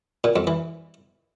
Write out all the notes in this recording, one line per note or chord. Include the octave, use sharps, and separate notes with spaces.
A#2
F2
E3